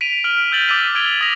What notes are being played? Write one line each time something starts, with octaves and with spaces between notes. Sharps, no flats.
B6 D7 D#7 F7
F6 D7 F#7
E6 G6 A6 F#7
D6 E6 A6 B6 D#7
E6 G#6 D7 F7 G7
D#6 A6 A#6 F7